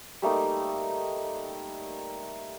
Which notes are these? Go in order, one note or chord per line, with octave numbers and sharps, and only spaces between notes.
G3 A3 A#3 D#4